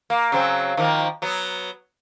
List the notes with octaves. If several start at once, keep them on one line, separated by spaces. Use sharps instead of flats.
A#3
C#3 F#3 C4
D#3 F3 A#3
F#3 B3